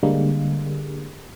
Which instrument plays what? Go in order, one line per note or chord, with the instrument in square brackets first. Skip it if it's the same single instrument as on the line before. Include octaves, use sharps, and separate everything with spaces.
[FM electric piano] D3 G3 G#3 A#3